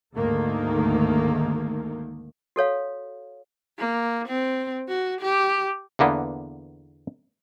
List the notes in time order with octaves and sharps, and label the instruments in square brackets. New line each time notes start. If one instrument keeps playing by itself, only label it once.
[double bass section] D2 G#2 D#3 A3 A#3
[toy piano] F#4 A4 C#5 F5
[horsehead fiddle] A#3
C4
F#4
G4
[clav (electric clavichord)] E2 D3 A#3 B3